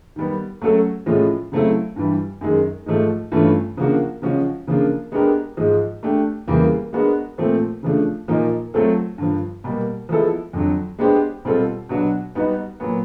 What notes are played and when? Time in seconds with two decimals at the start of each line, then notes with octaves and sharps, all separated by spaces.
0.16 D#3 G3 B3
0.61 F#3 A3 C#4 F#4 A4
1.06 A2 F3 G#3 C#4 F4
1.52 C#3 F#3 A3 C4 E4
1.96 G2 E3 G3
2.41 F#2 D#3 G#3
2.86 G#2 F3 A3
3.32 G2 E3 A3 C#4 F4
3.77 C#3 F3 A#3 D4 F#4
4.22 C#3 F3 G#3 C#4 F#4
4.67 C#3 F3 A#3 D4 F4
5.12 G#3 B3 D4 G4 A#4
5.57 G#2 F3 G#3
6.03 A3 D4 G4
6.47 E2 C#3 E3 G3 A#3
6.93 G#3 B3 D4 F#4 A#4
7.38 A#2 F3 A3 C4
7.83 C#3 F3 A3 D4
8.28 A#2 F3 A#3 D#4
8.74 F#3 A3 C4 F4 A4
9.18 G2 D3 F3
9.64 B2 G3 A#3
10.09 F3 G#3 B3 E4 A4
10.53 F2 D3 F#3
10.99 G#3 B3 D4 G4 C5
11.45 B2 G3 C4 F4 A4
11.89 B2 F#3 B3 D4 F#4
12.35 G3 B3 D#4 F#4 B4
12.80 A#2 F#3 B3